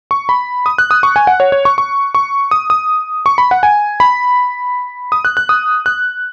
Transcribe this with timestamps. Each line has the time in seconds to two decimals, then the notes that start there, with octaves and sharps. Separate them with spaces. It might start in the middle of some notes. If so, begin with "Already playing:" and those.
0.11 C#6
0.29 B5
0.66 D#6
0.78 F#6
0.91 D#6
1.03 C#6
1.16 G#5
1.27 F#5
1.40 C#5
1.52 C#5
1.65 C#6
1.78 C#6
2.15 C#6
2.51 D#6
2.70 D#6
3.26 C#6
3.38 B5
3.51 F#5
3.63 G#5
4.00 B5
5.12 D#6
5.25 F#6
5.37 F#6
5.49 D#6
5.86 F#6